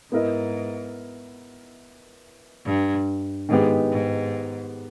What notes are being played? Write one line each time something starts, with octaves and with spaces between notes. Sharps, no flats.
G#2 B3 E4 A#4 D#5
G2
G#2 D#3 G#3 B3 G4
G#2